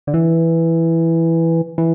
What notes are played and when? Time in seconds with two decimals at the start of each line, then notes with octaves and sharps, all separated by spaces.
0.07 D3
0.14 E3
1.78 E3